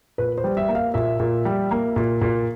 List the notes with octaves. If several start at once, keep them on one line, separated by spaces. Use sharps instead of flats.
A#2 B4
C5
G3
E5
A#3
F5
A#2 E5
A#2
G3
A#3
A#2
A#2